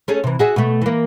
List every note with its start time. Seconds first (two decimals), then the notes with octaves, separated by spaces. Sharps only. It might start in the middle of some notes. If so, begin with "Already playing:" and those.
0.08 A3 C#4 G#4
0.24 C3 E3
0.39 F#4 G#4 E5
0.56 B2 A3
0.82 E3 A#3